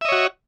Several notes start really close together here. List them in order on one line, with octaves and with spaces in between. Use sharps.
E5 D#5 C#5 F#4